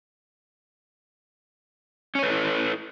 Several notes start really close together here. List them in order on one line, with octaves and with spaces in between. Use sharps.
C#4 C#5 B4 A4 E4